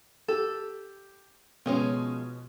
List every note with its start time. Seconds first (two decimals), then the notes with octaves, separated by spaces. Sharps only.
0.28 G4 A4
1.66 B2 F3 G#3 B3 C#4